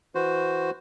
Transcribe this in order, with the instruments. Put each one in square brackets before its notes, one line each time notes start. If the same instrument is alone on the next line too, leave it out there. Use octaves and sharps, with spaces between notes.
[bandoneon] E3 F#4 C5